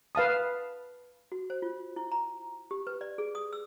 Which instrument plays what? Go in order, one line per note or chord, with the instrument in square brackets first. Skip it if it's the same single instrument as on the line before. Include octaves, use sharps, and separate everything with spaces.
[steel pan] B4 F5 A5 D#6
[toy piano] F#4
C5
F4
E4
A#5
G4
B4
D5
G#4
D#6
E6